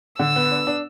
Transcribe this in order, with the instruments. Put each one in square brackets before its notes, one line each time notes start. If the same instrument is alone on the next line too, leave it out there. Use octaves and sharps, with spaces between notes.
[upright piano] D3 [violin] E6
[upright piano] B3
D4
D4